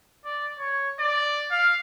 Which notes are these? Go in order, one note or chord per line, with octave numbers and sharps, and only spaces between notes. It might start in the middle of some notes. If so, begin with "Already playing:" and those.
D5
C#5
D5
F5